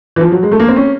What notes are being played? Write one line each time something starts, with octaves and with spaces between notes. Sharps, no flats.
E3
F3
F#3
G#3
A3
A#3
C4
C#4